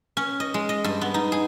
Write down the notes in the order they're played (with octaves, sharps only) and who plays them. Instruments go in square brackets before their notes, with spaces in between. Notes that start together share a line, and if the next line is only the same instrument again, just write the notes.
[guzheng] C#4
D#5
G#3
D#5
G2
B3
D#4
G#4